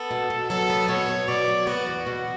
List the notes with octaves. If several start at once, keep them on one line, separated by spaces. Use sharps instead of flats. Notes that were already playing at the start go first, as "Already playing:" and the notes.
Already playing: B3 A4
B2
B2
F#3 A4
B3
B2 C#5
B2
B2 D5
F#3
B3 F#4
E2
B2 F#4